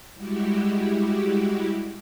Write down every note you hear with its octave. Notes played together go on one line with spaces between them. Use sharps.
G3 G#3 E4 F#4 G4